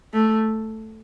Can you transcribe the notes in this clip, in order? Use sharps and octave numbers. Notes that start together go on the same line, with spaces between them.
A3